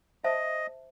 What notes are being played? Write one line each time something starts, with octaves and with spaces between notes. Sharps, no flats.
C5 D#5 E5 A5